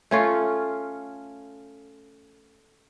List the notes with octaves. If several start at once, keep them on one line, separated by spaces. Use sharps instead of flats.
A3 C#4 F4